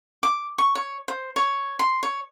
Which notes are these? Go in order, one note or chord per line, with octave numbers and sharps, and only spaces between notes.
D6
C#6
C#5
C5
C#5
C6
C#5